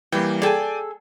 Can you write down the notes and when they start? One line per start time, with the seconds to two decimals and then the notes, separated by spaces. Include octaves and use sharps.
0.12 E3 G3 A#3 G5
0.42 G#4 A4 D5 G5 G#5